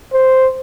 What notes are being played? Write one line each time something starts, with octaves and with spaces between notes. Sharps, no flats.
C5